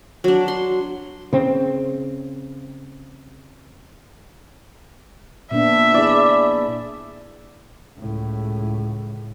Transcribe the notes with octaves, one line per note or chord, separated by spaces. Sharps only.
F#3 D4
C6
C#3 C4
A#2 B3 D4 E5
E4 G#4 D5
C#2 A2